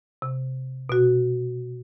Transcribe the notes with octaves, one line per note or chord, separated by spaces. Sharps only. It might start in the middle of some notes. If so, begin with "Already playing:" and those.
C3
B2 F#4